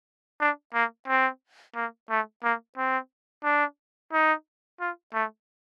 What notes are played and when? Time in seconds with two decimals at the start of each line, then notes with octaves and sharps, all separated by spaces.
0.40 D4
0.74 A#3
1.08 C4
1.75 A#3
2.10 A3
2.43 A#3
2.77 C4
3.44 D4
4.13 D#4
4.80 F4
5.14 A3